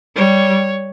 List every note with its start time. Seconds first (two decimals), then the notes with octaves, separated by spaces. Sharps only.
0.15 G3 C#5